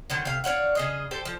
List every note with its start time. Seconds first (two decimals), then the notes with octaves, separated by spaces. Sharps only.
0.10 D3 D#3 F#3
0.25 C3 F5
0.44 D4 C#5 F5 F#5
0.75 C#3 G#4 D#5
1.11 G4 A4 C5
1.25 F3